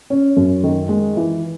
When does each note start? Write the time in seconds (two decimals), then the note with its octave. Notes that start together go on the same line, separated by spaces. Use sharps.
0.10 C#4
0.37 F#2
0.64 D#3
0.89 G#3
1.17 E3